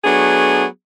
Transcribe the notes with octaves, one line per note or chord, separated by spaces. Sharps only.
F#3 A3 B3 D4 G#4